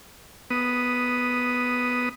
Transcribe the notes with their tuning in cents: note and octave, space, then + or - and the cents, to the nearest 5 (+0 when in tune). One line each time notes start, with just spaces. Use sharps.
B3 +0 D#6 +0